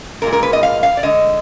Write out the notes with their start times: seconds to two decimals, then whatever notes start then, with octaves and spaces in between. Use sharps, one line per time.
0.22 A#2 G#3 A#4
0.33 A#4
0.43 B4
0.53 D#5
0.63 F5
0.83 F5
0.97 D5
1.03 D3 G#3 D#5